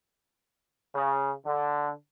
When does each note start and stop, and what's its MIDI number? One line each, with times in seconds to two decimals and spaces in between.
0.94 1.31 49
1.46 1.91 50